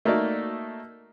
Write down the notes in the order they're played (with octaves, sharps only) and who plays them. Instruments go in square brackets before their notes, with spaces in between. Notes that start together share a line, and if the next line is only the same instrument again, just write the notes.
[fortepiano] A3 A#3 D#4 F#4 D5